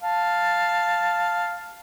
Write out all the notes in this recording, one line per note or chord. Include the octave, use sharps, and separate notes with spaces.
F5 A5